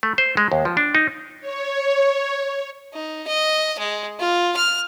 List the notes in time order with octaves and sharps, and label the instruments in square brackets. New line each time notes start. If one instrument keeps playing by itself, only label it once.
[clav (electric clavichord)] A3
C5
G#3
D#2
F3
D4
D#4
[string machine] C#5
[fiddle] D#4
D#5
G#3
F4
F6